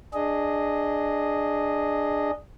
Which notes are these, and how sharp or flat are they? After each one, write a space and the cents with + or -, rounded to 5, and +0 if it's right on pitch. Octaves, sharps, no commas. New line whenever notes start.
D4 +10 G#4 +0 D#5 +0